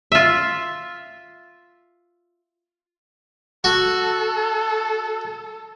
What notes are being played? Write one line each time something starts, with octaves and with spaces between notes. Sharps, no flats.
F4 E5
F#4 A4